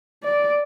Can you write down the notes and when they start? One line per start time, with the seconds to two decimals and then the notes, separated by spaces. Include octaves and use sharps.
0.24 D5